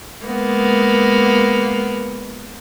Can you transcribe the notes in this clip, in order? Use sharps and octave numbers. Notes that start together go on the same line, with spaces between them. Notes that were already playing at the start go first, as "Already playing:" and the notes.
G#3 A#3 B3